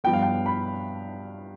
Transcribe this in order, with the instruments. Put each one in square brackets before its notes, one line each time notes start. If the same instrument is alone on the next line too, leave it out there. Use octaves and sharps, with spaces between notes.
[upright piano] G2 F3 B3 G5
F5
G5
B5